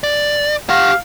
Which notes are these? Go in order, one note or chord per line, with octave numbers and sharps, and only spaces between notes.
D5
G4 F5 F#5